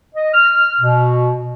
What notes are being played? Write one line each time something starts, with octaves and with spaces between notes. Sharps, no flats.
D#5
F6
B2